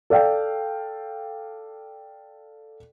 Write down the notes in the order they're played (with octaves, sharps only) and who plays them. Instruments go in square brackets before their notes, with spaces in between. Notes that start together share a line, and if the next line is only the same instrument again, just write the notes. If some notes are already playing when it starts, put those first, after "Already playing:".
[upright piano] A4 D5 F5 G5